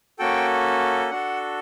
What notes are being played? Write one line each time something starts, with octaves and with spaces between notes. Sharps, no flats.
A#3 C#4 F#4 A4 G5
D4 F#4 A4 F#5